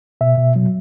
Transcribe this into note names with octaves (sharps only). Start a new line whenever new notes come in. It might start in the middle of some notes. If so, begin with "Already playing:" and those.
B2 E5
B2
F#3